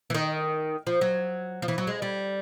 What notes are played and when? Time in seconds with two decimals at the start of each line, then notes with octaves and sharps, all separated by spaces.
0.10 E3
0.14 D#3
0.87 F3
1.01 F#3
1.62 F3
1.68 E3
1.78 F#3
1.87 G#3
2.02 G3